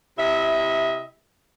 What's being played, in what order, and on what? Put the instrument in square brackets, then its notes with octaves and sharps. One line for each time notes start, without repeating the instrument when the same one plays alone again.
[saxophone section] C3 E4 D#5 E5